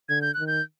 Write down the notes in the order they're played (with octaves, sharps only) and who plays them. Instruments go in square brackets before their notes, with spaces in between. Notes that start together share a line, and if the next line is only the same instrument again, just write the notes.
[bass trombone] D3 [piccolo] G#6
[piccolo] G6
[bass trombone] D#3 [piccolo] F#6
[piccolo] G6